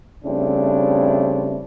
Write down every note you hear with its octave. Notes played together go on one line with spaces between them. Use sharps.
C#3 G3 A3 C4 D4 E4